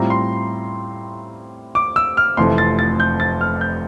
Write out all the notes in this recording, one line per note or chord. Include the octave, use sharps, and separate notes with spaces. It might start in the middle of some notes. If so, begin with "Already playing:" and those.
Already playing: A2 G3 C4 F4 A#5
C6
D6
E6
F6
F1 F2 C3 E3 A3 C6
A6
A6
G6
A6
F6
G6